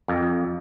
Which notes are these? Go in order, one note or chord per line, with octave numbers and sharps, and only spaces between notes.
F2